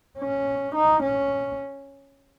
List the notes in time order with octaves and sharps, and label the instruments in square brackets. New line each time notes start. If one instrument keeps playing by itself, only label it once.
[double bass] C#4
D#4
C#4